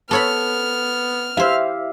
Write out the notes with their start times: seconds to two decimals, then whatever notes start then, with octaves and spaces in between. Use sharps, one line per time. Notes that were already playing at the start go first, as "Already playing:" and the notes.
0.11 B3 A4 C#5 B5 F6
1.37 E4 G4 C5 E5 F5